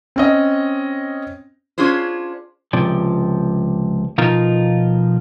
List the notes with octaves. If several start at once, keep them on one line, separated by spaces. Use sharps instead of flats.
C4 C#4 D#5
C#4 D4 F4 G#4 C5
C#2 C3 F3 D5
B2 F3 D#4 F4 A#4